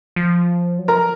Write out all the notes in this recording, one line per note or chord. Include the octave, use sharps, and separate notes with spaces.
F3
F#3
F3 A#4 A#5